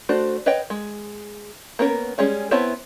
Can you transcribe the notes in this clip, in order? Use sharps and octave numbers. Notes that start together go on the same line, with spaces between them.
A3 D4 F#4 C5
B4 C#5 D#5 F#5 G5
G#3
A#3 B3 C#4 A#4
G3 G#3 C#4 G#4
B3 C4 E4 C#5 A5